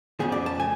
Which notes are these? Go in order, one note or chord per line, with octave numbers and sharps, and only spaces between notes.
F2 C#3 F3 B3 G#4
D5
A5
A3 G#5